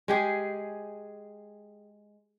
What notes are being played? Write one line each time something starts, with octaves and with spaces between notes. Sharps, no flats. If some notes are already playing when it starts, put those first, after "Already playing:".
G#3 G4 G#4